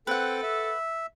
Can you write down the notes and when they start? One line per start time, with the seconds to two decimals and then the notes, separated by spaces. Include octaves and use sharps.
0.07 C4 A4 B4 F#5 G5
0.43 E5